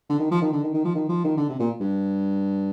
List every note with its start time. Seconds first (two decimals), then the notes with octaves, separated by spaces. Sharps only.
0.09 D3
0.19 D#3
0.31 F3
0.42 D#3
0.53 D3
0.63 D#3
0.74 D#3
0.85 F3
0.95 D#3
1.09 F3
1.24 D#3
1.37 D3
1.49 C3
1.59 A#2
1.80 G2